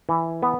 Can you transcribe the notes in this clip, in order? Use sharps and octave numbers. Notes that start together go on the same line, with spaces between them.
E3
B3